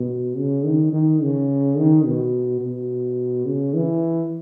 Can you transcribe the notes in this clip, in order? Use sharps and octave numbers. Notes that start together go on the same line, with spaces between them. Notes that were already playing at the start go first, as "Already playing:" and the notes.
Already playing: B2
C#3
D#3
D#3
C#3
D#3
B2
B2
C#3
E3